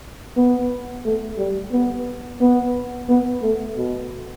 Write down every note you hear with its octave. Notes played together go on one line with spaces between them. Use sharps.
B3
A3
G3
B3
B3
B3
A3
B2